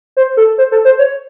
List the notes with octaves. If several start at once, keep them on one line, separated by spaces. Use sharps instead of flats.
C5
A4
C5
A4
C5
C#5